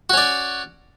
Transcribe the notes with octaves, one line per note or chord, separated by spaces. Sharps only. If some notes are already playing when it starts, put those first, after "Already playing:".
C#4 F#4 D5